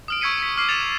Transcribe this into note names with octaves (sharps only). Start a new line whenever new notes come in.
D#6 F6 D7
C#6 E6 G#6 B6 C#7 D#7
B6
D6 F6 C7
A6 C#7 E7 F7
F7